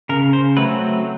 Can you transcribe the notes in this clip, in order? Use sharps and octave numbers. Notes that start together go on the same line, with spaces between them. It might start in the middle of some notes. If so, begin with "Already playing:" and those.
C#3 A#4
C5
F#3 A3 C4 B4